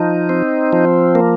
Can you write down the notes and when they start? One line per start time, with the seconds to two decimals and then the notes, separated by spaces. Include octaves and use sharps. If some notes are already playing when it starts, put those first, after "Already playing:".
Already playing: F3 D#4
0.29 C4
0.73 F3
1.15 A#3